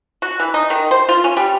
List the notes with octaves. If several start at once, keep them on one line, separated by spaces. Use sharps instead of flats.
F#4
E3
D#4
D#3
C5
F4
C#4
G3